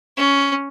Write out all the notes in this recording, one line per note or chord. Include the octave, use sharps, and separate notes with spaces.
C#4